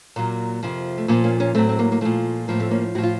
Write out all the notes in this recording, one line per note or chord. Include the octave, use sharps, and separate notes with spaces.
A#2 F#3 A#3
F2 C3 F3
A3
A#2 F3 A#3
A#3 C#4
A#3 C#4
A2 F#3 A3 C4
C4
A#3
A#3
A#2 F3 A3
A2 F3 A#3
A3 C4
A#3 C#4
A2 F3 F#4
F4